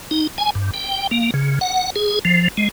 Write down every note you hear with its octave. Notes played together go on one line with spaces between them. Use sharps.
D#4
G#5
G2
G5
A#3
C#3
F#5
G#4
F3
G#3